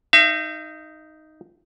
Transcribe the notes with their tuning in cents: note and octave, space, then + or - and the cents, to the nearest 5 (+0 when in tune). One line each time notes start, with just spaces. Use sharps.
D#4 +0 E5 +45